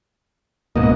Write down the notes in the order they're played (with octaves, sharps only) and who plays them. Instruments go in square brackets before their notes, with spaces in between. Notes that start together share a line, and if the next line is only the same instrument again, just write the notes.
[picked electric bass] D1 G#2 [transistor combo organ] B2 A#3 D#5